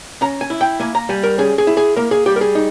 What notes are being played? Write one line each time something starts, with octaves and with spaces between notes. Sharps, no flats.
C#4 A#5
G#5
E4
G5
A#3 G#5
A#5
G3 G#5
A#4
C#4 G#4
G#4
E4
G#4
A#3 A#4
G#4
G3 G4
A#4
G#4
D#4